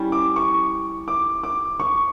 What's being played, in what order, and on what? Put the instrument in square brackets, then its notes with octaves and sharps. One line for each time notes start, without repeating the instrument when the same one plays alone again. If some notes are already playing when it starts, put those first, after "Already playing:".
Already playing: [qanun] G3 C#4 E4
[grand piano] D6
C#6
D6
D6
C#6